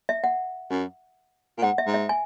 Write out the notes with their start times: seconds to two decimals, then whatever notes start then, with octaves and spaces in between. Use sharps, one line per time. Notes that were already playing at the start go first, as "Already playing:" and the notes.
0.09 E5
0.24 F#5
0.70 F#2
1.58 A#2
1.62 G#2 F#5
1.78 E5
1.86 G#2
1.94 E5
2.09 G#5